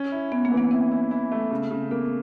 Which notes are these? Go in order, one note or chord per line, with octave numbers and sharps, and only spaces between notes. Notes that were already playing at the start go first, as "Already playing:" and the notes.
Already playing: C#4
E4
B3 C#4
A#3
E3
B3
C4 E4
E4
E4
A3
C#3
C#3
A#3 B3